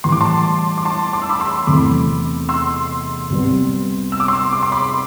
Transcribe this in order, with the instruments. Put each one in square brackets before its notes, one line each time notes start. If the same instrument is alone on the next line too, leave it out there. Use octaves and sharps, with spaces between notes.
[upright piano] A2 E3 G3 [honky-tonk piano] C6
[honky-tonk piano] D6
A5 C6
D6
A5 C6
D6
E6
B5 D6
C6 E6
[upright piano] E2 C3 E3 A3 [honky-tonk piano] B5 D6
[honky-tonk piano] C6 E6
[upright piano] C2 C3 G3 B3
[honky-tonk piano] E6
D6
C6 E6
D6
C6
B5 D6